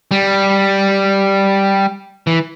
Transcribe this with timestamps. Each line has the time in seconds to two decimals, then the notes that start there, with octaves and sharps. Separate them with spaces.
0.11 G3
2.27 E3